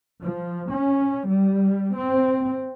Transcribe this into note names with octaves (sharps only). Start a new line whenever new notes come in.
F3
C#4
G3
C4